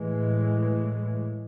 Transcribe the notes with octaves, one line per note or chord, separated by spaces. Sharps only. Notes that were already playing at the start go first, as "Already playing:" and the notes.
Already playing: A2 E3 G#3